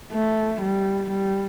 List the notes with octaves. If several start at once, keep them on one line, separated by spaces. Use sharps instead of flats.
A3
G3
G3